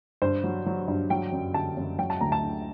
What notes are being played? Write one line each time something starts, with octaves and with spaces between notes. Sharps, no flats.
G2 C5
F#3
F#3
G2
F#3 G5
F#2
D3 A5
F#2
F#3 G5
A5
D2 A#5
A5
D3